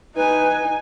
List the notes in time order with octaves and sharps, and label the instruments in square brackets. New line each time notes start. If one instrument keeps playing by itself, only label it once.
[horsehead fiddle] D#4 G#5 [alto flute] B4